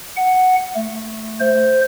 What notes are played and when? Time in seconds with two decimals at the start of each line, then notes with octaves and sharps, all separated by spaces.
0.17 F#5
0.76 A3
1.40 C5